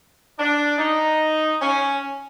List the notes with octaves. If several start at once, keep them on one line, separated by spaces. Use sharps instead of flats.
D4
D#4
C#4